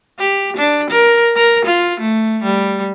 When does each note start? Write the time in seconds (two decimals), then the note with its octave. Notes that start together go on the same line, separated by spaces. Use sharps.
0.19 G4
0.57 D4
0.91 A#4
1.36 A#4
1.66 F4
2.01 A3
2.44 G3